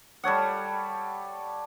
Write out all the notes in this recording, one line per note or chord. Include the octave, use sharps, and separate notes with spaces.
G3 A4 C#5 F#5